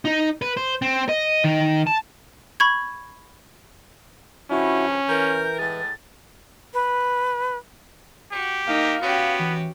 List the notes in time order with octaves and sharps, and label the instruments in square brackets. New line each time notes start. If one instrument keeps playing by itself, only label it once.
[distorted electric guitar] D#4
B4
C5
C4
D#5
D#3
A5
[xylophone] B5 C#6 G#6
[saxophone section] G2 C#3 F3 [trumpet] C#4 [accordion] E4 F#4
[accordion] E3 [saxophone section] A#4 [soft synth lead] G6
[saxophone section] A2 G#3 G#4 [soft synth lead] A6
[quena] B4
[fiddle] F#4 [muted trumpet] G4
[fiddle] A#3 [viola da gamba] D#4 [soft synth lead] F5
[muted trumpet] B3 [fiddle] C#4 G4 [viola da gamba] F#4
[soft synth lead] E3